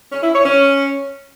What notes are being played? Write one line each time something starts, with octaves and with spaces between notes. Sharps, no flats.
C#4
E4
C#5
C#4